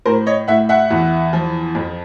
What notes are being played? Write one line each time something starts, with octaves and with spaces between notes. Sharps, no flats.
A2 A#4 C5
C#5 D#5
A2 E5 F#5
E5 F#5
E2
F3
F2